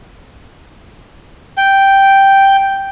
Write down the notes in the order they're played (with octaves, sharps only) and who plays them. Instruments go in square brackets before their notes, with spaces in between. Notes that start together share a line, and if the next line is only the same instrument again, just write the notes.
[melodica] G5